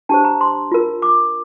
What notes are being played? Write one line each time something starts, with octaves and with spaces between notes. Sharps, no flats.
D4 G4 C5 A5
A#5
C6
F4 A#4
D6